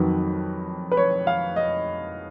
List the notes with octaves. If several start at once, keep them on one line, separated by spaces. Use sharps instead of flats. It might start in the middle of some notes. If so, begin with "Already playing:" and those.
Already playing: F2 D#3 F#3 B4
B4
C#5
F5
D#5